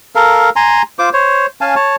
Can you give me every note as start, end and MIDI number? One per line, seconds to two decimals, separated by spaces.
0.15 0.50 69
0.15 0.50 70
0.15 0.50 77
0.56 0.82 80
0.56 0.82 82
0.56 0.82 84
0.99 1.10 65
0.99 1.10 72
0.99 1.10 86
1.13 1.46 72
1.13 1.46 73
1.61 1.75 61
1.61 1.75 77
1.61 1.75 80
1.61 1.75 81
1.75 1.96 73
1.75 1.96 81